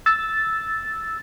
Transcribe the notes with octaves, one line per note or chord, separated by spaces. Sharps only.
E6 A6